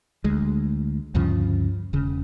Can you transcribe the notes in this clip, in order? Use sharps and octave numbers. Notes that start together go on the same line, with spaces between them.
D2 G#3
D2 G2 C#3 F3
E1 C#3